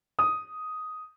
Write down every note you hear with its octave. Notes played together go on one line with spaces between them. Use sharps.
D#6